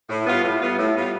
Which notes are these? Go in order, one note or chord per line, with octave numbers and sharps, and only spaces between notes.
A2
G3 B3 F4
A2
G3 B3 F4
A2
G3 B3 F4